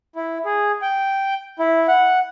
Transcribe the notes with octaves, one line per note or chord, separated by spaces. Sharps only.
E4
G#4
G5
E4
F#5